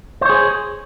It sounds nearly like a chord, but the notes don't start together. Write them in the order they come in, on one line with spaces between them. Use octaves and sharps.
C5 C#5 G#4